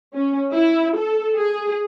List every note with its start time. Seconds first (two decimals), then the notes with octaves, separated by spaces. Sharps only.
0.15 C#4
0.53 E4
0.98 A4
1.36 G#4